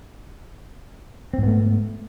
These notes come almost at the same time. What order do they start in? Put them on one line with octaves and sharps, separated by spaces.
C4 G#2 B3 A3